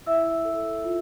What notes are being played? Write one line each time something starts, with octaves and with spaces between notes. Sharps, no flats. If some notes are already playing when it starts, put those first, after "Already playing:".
E4 E5 E6
A4
F4